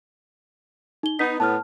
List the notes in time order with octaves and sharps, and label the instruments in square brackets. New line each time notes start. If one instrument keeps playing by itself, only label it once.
[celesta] D#4 G7
[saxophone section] B3 D#4 [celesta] B6
[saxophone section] A2 B3 [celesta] A5 F6